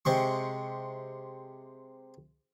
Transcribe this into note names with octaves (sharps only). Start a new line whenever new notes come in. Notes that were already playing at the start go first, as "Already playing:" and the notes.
C3 G#3 C#6